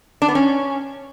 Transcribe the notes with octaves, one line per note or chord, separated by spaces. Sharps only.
D4
B3
C#4